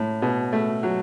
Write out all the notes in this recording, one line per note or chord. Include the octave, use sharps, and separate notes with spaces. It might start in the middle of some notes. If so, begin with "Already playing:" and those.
Already playing: A2
B2
A3
F#3